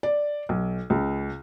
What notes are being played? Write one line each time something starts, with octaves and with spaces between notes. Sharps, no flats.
D5
B1
C#2